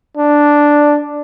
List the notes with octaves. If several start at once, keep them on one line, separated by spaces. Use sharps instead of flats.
D4